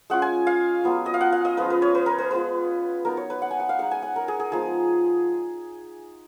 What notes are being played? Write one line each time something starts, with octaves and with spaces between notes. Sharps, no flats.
G#3 C#4 F4 F#5
G#5
F5
F#3 B3 F4
D#5
F5
F#5
F5
D#5
F3 G#3 C#4 F4 B4
B4
C#5
B4
A#4
B4
G#3 B3 F4 B4
F#3 B3 D#4 A#4
C#5
B4
F#5
G#5
F#5
F5
G#3 D#4 F#5
G#5
F#5
A#4
G#4
G#4
F3 G#3 B3 D#4 G#4